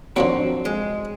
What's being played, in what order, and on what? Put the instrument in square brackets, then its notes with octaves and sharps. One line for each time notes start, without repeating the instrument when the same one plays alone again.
[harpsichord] D3 F3 F#3 [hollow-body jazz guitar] C4
[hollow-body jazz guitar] G#3